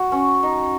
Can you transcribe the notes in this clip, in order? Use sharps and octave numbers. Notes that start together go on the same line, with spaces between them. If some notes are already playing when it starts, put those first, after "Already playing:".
Already playing: F#4
C#4
D#4